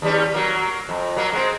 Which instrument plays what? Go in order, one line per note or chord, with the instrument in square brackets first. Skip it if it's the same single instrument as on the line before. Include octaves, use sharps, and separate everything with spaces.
[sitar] D#2 G3 C#4
F#3 A#3
F2
F#3 A#3
G#3 C4